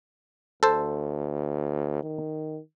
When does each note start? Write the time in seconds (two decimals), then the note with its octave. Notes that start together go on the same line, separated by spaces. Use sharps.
0.63 D2 A4 C5
2.04 D#3